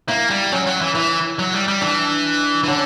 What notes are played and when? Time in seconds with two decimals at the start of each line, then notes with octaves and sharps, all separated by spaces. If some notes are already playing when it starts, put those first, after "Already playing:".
0.08 A#3 E4
0.30 G3
0.52 F#3 C#4
0.67 F#3
0.81 E3
0.95 E3 E4
1.39 F#3
1.53 G3
1.68 G3
1.81 E3 D4
2.64 E3
2.68 D3 C#4